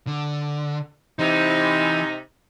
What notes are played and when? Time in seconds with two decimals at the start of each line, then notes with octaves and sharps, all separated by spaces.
0.07 D3
1.19 C3 E3 D#4